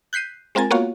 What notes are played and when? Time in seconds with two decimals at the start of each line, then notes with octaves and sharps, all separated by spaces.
0.13 F#6 G6 B6 C7 D#7
0.55 G#3 C4 F4 A#4 G#5 A6
0.71 A#3 B3 F4 F#4 C#5 F5